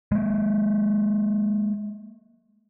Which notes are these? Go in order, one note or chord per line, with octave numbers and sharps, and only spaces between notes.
G#3 A#3